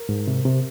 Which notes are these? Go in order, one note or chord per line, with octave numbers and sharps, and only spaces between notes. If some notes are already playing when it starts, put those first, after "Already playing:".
Already playing: A#4
G#2
C3
C3